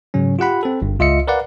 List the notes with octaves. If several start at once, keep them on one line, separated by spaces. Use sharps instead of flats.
G#2 C#3 F#3 C#4
F4 G4 F#5 B5
C4 A4
G1 G2
C#2 F4 D#5 E5 C#7
A#4 B4 D5 F5 F#5